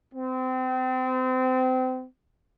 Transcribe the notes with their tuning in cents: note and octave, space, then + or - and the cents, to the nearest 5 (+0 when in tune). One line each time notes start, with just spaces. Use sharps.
C4 -30